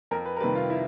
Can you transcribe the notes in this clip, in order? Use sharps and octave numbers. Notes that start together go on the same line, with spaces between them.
F2 A#4
B4
A#4
C3 D#3 G3 B4
F4
E4